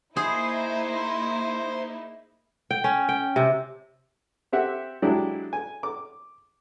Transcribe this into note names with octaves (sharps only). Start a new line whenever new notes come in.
A#3 D#4 E4 G#4 C5
G5
C#4
G5
C3
C4 G4 E5 F#5
F#3 G#3 D4 E4 G4
G#5
D6